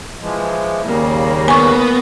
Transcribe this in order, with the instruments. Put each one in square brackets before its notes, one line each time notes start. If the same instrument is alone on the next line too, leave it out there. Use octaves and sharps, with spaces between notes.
[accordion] E3 F3 G#3
[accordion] D#2 C#3 G3 [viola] A#3
[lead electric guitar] B3 [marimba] G#5 C#6